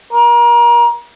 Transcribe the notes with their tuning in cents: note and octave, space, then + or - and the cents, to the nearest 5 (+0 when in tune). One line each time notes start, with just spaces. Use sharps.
A#4 +30